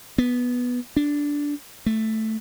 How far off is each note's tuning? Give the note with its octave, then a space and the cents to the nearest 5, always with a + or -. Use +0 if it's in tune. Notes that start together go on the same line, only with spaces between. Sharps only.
B3 -5
D4 -10
A3 +0